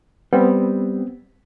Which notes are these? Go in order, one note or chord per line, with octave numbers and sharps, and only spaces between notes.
G3 B3 C4